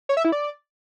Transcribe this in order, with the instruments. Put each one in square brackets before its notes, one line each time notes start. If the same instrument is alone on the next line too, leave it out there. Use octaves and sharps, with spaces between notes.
[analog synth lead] C#5
E5
E4
D5